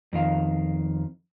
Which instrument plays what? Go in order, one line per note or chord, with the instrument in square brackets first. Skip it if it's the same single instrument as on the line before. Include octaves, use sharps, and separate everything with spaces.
[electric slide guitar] F2 D#3 F5